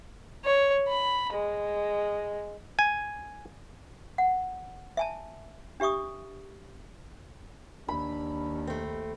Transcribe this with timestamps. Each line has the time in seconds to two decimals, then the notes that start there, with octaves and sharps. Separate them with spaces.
0.44 C#5
0.88 B5
1.34 G#3
2.79 G#5
4.18 F#5
4.97 E5 G#5 A5
5.80 D4 G4 E5 C#6 D#6
7.88 D#2 D4 B5
8.67 A3 C4